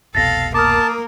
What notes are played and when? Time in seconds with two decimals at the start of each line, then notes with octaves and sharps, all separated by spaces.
0.15 F1 C2 B2 A4 F5 A6 A#6
0.54 A#3 A#4 A5 D6 D#6 F6